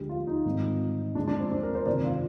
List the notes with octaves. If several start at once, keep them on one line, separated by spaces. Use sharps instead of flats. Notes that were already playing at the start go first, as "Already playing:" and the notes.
Already playing: D2 D3 F3 G#3 G4
F4
D#4
G#1 G#2 D#3 G3
G1 G2 F3 G#3 D4
D4
C4
D4
A#4
C5
G1 F2 C3 D#3 G#3 D5
F4